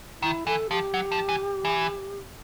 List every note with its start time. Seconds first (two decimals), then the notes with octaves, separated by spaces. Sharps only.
0.22 D#3 E4
0.46 E3 A4
0.70 F3 G4
0.94 F#3
1.12 F3
1.29 E3
1.65 E3